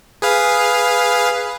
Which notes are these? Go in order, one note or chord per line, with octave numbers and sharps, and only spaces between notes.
G#4 B4 F5